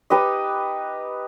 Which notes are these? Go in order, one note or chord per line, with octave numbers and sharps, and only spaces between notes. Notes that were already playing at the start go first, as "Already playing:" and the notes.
D#4 G4 B4 D#5